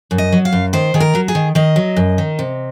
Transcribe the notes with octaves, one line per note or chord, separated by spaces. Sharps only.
F#2
D#5
F#3
F5
F#2
D#3 C5
D#3 G#4
A#4
F#3
G#4
D#3
D#3 D#5
F#3
F#2
D#3
C3